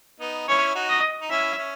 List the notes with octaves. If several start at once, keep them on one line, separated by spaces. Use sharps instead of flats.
B3 D#4
C#4 E4 C#5
D#4 F#4
D#5
D#4
C#4 E4 E5
C#4